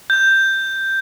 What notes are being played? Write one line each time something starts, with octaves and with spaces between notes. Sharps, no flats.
G6